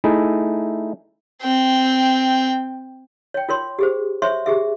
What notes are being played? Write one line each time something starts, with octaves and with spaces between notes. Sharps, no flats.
A3 D#4 E4 G#4
C4 G5
C#5 G5
F4 A#4 C#5 C6
G4 G#4 C5
C5 C#5 E5 C6 C#6
G4 G#4 E5